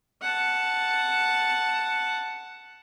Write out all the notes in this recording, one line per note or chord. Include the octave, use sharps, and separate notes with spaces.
F#5 A5